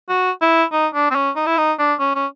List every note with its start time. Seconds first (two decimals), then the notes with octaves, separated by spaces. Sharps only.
0.09 F#4
0.42 E4
0.72 D#4
0.94 D4
1.11 C4
1.16 C#4
1.36 D#4
1.47 E4
1.58 D#4
1.79 D4
2.00 C#4
2.15 C#4